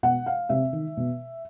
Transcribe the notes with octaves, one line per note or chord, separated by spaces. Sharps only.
B2 F#5
F5
C3 E5
D#3
B2